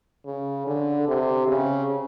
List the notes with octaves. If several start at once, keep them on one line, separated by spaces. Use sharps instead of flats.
C#3
D3
C3
C#3